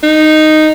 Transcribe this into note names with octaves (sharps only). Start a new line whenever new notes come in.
D#4